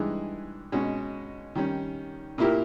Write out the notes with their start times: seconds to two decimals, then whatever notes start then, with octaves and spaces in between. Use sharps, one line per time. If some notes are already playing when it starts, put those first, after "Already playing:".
Already playing: G2 E3 G#3 D#4 G#4
0.72 B2 G#3 C#4 G#4
1.55 D#3 G3 C#4
2.38 A#2 A#3 E4 G4 A#4